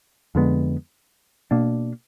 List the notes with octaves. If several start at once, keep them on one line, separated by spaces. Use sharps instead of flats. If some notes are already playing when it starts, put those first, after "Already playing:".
F2 D3 G#3 B3
B2 A#3 D4